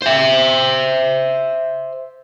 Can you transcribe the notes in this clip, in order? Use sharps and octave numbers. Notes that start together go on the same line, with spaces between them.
C5 E5